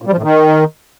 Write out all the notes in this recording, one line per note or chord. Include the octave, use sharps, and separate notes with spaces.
A#2
G3
F3
A2
D#3